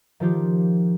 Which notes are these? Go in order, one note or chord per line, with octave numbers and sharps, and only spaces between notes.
D#3 F3 F4 G4